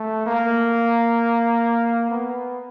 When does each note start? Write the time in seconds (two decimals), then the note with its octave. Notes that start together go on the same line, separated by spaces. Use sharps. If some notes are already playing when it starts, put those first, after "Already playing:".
Already playing: A3
0.26 A#3
2.10 B3